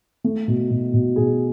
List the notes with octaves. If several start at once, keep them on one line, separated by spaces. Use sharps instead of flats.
A3
B2
B2
B2
B2 G#4